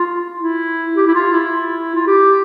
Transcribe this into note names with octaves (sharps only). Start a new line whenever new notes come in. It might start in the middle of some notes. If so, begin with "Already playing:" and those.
Already playing: F4
E4
G4
E4
F4
E4
F4
G4